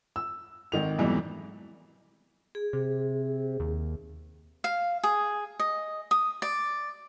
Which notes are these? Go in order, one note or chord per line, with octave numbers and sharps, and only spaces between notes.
E6
G#1 D#3 F7
F2 G#2 B2 E3 F#3 G3
G#4
C3
D#2
F5
G#4
D#5
D#6
D5